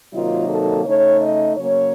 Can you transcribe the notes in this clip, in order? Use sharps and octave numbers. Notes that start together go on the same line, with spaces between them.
C3 D#3 F#3 A#3 D#4 F4
A4
C#3 A3 D#4 C#5
D#5
C#3 F#3 A#3 C#4 C#5